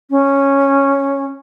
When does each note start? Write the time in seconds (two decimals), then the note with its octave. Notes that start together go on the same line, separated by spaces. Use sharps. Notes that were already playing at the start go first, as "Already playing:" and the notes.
0.10 C#4